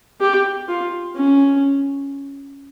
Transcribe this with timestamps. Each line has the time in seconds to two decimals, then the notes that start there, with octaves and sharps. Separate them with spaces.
0.21 G4
0.69 F4
1.16 C#4